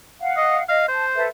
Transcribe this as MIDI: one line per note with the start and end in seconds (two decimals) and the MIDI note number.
0.20 0.63 77
0.20 0.63 78
0.37 0.58 75
0.69 0.85 75
0.69 0.85 77
0.88 1.25 72
0.88 1.04 81
1.15 1.27 69
1.15 1.27 71
1.15 1.27 76